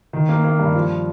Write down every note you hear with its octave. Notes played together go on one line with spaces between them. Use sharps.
D#3
A#3
A#3
G2
F3